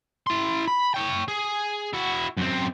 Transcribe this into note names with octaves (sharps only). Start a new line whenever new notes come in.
E4 C6
B5
C#5 G5
G#4
E4 F#4
F#2 C4